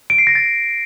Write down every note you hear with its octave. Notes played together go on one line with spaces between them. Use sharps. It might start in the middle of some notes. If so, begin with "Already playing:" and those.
D7
C7
A#6
A6